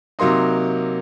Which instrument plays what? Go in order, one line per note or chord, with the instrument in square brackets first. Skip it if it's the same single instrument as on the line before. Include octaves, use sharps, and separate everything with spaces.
[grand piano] C3 F#3 A#3 D#4 C6